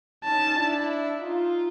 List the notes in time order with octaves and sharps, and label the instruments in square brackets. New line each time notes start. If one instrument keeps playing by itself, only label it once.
[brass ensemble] C#4 D#4 [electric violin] A5
[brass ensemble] D4 E4
D#4 F4